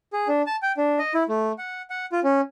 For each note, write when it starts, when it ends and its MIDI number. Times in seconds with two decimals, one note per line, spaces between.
0.13 0.28 68
0.28 0.42 62
0.46 0.56 81
0.62 0.72 79
0.77 0.99 62
0.99 1.13 75
1.14 1.24 64
1.29 1.52 57
1.58 1.82 78
1.90 2.06 78
2.12 2.20 65
2.24 2.41 61